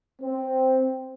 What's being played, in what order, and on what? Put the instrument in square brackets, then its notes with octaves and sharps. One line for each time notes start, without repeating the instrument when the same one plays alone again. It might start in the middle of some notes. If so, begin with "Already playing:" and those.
[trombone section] C4